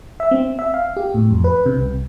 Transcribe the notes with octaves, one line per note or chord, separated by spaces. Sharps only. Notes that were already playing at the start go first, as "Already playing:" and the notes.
E5
C4
E5
F5
G4
A2
F2
B4
C3
C2